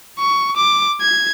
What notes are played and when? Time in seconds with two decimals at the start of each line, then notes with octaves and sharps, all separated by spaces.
0.19 C#6
0.57 D6
1.01 G#6